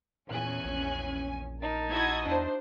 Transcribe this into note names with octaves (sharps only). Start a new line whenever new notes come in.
E2 A#2 C#4 G#5 F#6
A#1
D#4 A#4 A5
E4 F#4 D#5 G#6
E2 D4 C5